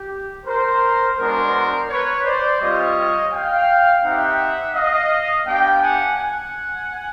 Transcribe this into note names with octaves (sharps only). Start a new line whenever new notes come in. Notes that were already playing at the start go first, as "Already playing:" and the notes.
Already playing: G4
A#4 C5
G#3 B3 D4 F#4 A#4 C5
B4 C#5
C5 D5
G3 C4 F4 C#5 D#5
F5 G5
C4 D#4 G4 E5 F#5
D#5 F5
B3 D4 G4 F5 G5
F#5 G#5
F#5 G#5